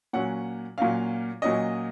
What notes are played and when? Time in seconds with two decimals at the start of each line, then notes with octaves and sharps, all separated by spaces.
0.13 A#2 F#3 C#4 F#5
0.78 A#2 F#3 C#4 F5
1.42 A#2 F#3 C#4 D#5